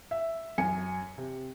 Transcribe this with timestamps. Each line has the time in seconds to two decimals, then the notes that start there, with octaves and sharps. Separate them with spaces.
0.11 E5
0.58 F#2 G#5 C#7
1.18 C3